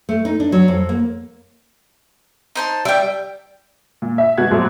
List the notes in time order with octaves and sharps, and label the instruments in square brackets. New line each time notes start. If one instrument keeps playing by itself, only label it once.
[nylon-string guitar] A3
D#4
D4
F#3
F2
A#3
[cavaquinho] D#4 C5 A5
[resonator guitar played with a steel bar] G3 [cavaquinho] E5 G5
[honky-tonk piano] A#2
E5
B2 G3 F#4 F#6 G#6
A#1 F#3 G3 A3